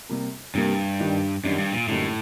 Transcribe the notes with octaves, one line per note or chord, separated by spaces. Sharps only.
C3 G3 A#3
G2 C3 G3 A#3
D#3 G3 D4
F#2 D#3 G3 D4
G2
A#2
F#2 A2 D3 G3 A#3 D#4